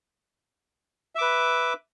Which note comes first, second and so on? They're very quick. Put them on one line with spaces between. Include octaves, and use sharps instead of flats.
E5 D6 B4